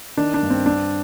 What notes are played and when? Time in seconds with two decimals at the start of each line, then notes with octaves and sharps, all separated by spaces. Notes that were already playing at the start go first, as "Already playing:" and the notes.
0.17 D#3 D4
0.34 D4
0.42 G2
0.50 C4
0.66 C4 D4